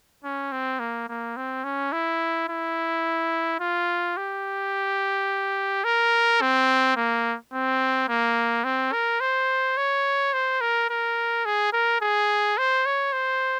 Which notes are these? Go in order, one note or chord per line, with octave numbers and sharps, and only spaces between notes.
C#4
C4
A#3
A#3
C4
C#4
E4
E4
F4
G4
A#4
C4
A#3
C4
A#3
C4
A#4
C5
C#5
C5
A#4
A#4
G#4
A#4
G#4
C5
C#5
C5